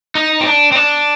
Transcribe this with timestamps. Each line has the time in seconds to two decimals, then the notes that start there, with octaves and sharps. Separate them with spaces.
0.15 D#4
0.41 C4
0.45 D4
0.72 C4
0.75 D4